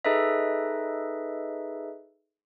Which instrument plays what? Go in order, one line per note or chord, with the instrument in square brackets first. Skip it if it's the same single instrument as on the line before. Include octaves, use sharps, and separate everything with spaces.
[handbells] D#4 G#4 A4 B4 D#5 E5